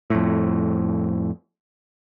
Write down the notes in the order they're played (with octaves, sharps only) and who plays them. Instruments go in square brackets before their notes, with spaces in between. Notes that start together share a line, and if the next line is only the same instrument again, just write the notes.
[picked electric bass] F2 A2